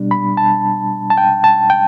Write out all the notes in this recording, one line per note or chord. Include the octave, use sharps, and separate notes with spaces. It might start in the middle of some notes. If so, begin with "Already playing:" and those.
Already playing: B2 G3 D4
B5
A5
A5
G5
A5
G5